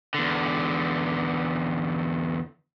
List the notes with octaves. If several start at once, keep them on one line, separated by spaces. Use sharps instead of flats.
E2 D3